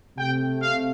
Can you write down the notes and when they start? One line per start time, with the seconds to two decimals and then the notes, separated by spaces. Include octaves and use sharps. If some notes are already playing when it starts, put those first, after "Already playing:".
0.17 C3 A3 G5
0.61 F5